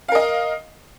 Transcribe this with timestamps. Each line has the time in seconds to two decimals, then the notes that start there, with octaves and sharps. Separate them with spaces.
0.08 F5
0.12 A#4
0.15 D#5